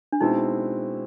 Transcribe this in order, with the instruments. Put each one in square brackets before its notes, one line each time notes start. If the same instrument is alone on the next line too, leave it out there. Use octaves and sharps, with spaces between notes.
[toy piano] D4
[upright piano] B2 G#3 C4 E4 [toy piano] D#4